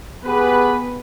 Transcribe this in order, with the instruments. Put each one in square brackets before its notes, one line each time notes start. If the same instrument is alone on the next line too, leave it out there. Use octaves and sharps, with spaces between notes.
[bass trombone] B3 [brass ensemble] G4 G#4 B4